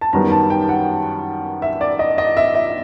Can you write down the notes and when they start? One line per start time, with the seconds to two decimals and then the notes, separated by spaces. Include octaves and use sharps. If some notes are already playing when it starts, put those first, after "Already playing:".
0.01 A5
0.13 F#2 D#3 G3 B3 A#5
0.32 A5
0.50 G5
0.69 F#5
1.62 E5
1.81 D5
1.99 D#5
2.18 D#5
2.37 E5
2.55 E5